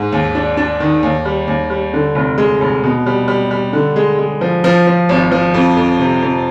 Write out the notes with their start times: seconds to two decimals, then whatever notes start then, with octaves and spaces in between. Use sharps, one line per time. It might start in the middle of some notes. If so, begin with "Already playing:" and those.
Already playing: G#2
0.12 D#2
0.35 D4
0.57 D4
0.80 D#3
1.03 D#2
1.25 G3
1.48 D#2
1.70 G3
1.94 D3
2.15 F1
2.38 G#3
2.61 F1
2.84 B2
3.06 G3
3.28 G3
3.51 G3
3.73 D3
3.96 G#3
4.18 G#3
4.41 F3
4.64 F3
4.87 F3
5.09 G#1
5.32 F3
5.54 F2
5.77 F2
6.00 C3
6.22 F2